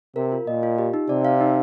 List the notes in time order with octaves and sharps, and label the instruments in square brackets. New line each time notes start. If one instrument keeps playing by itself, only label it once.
[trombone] C3 [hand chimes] A#4
[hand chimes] F4
[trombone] A#2 [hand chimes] D#5
[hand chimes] F4
G4
D#4
[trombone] C3 [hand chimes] D5
[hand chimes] F5
D#4